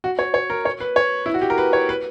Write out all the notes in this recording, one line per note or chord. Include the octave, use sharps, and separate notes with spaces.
F#4
C#5
C#5
A#4
C#5
B4
C#5
E4
F#4
G4
A#4
B4
C#5
B4